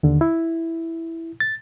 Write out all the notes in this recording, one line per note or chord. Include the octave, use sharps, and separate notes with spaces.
D#2 D3
E4
A6